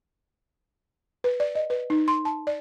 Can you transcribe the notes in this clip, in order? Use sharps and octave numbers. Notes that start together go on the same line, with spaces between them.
B4
D5
D#5
B4
D#4
C6
A5
D5